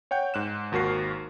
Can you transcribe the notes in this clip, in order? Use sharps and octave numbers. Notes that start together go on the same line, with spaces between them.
C#5 F#5 G5 G6
G#2 F#6 E7
G#1 D#2 F#4 A#4 C7